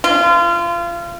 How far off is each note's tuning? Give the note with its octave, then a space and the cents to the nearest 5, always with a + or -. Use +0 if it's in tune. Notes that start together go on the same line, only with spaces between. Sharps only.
F4 -30